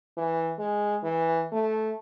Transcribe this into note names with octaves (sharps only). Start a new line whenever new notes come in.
E3
G#3
E3
A3